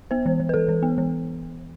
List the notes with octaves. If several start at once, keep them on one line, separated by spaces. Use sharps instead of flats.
B3 C5
E3
E3
B4
E3 A4
E3
B3
E3